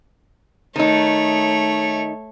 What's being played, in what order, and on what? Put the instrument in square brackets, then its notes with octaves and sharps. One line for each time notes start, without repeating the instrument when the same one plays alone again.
[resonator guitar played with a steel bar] D#3 D#4 [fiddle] A3 C#5